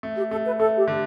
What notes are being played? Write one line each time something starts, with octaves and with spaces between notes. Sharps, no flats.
A3
G4
A3 A4
B4
A3 A4
G4
D3